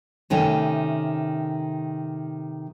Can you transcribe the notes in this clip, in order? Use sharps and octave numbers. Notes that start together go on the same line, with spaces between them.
C3 D#3 A3 C#4